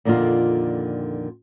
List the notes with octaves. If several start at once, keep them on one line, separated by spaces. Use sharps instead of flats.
F2 A#2 D3 D#3 F4